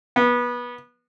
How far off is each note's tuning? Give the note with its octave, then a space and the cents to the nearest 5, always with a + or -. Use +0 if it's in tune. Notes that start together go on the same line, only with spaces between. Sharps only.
B3 -25